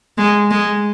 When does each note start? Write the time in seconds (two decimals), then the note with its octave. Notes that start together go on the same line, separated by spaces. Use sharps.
0.18 G#3
0.51 G#3